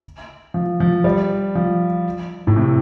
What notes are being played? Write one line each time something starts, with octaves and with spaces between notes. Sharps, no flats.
F3
F3
G3
F3
A2
C3